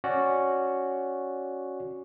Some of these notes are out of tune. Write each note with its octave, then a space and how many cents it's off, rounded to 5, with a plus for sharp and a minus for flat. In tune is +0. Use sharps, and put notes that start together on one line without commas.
C#4 +0 F#4 +0 D5 +0